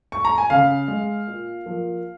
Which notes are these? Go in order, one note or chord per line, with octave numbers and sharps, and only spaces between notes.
C#6
A#5
G#5
C#3 F5
G#3
A#2
F3 A#3